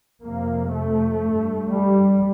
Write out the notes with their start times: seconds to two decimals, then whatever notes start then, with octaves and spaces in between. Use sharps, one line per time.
0.24 F2 C3 A#3
0.74 A3
1.23 G2
1.72 G3